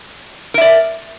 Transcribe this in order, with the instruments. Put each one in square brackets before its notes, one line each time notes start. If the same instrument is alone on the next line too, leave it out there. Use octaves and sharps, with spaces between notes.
[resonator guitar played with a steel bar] A#4
E5
D5